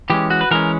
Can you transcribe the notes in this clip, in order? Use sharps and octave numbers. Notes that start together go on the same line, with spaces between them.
E3 G#3 C#4 G4
F#4
B4
E3 G#3 C#4 A#4